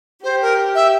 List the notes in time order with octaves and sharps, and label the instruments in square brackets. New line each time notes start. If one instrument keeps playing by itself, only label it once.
[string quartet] G4 [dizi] C5
[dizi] A#4
E5